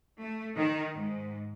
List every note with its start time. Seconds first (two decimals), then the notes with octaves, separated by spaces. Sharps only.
0.20 A3
0.56 D#3
0.93 G#2